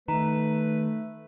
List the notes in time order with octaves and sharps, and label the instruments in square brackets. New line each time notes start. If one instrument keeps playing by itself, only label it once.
[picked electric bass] D#3 [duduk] A3 [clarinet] B4 [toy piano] A#5